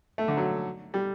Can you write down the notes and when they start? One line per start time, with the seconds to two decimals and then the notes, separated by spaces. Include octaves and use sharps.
0.18 A3
0.28 D3
0.37 F#3
0.94 G3